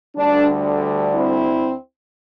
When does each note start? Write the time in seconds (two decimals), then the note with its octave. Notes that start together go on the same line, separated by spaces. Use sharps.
0.16 D2 D3 G3 D4
1.15 C4 E4